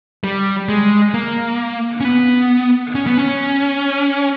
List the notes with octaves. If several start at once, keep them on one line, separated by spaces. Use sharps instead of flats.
G3
G#3
A#3
C#4
B3
C#4
B3
C#4